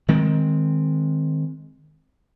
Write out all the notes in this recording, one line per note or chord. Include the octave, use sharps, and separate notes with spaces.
D#3 G#3 C4